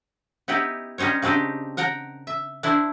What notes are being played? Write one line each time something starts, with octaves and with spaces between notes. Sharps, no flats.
B3 D#4 E4 G4 G5
G3 C#4 D#4 C5 C#5
C#3 C4 D4 D#4 G4
A#4 F#5 G5 A#5
E5
D4 E4 C5